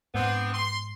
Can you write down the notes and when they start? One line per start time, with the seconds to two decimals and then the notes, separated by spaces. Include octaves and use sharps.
0.15 G#2 B3 C4 D4
0.54 C6